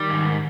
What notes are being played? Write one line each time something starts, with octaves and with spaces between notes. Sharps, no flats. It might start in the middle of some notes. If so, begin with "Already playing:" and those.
Already playing: D#3 G3
G#2